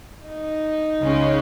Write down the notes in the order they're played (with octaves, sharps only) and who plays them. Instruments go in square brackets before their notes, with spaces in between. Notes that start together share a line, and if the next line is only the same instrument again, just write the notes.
[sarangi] D#4
[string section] C#2 C#3 G#3 C#4